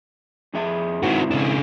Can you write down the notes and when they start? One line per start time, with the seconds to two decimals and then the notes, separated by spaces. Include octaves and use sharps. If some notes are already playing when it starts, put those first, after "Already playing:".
0.54 F2 G#4 E5
1.03 G#2 D#3 C4 E4 F#4
1.31 C#3 D4